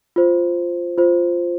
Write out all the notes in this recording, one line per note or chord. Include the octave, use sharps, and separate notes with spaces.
F4 C5
F4 C5